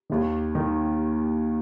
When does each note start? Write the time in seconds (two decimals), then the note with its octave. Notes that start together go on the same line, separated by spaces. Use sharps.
0.10 D#2 D#3
0.55 D#3